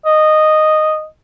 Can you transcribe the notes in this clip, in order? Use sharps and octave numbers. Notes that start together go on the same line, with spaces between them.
D#5